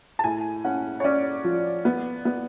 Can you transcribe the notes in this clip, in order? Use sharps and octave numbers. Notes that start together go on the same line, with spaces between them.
A5
A2 G#5
C#4 F#5
C#5
C#4 D5
F3
B3
B3